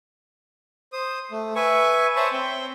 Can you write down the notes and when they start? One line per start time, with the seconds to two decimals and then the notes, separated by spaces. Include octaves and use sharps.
0.93 C5 D#6
1.31 A3
1.56 B4 E5 G#5 C#6
2.16 C5 C#5 E5 A5 B5 C#6
2.32 C4 G5